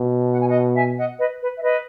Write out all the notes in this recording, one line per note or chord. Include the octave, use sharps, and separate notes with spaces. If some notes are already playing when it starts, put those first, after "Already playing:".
Already playing: B2
F#5
G#5
D#5 F#5
E5 G#5
D#5 F#5
B4 D#5
B4
E5
B4 D#5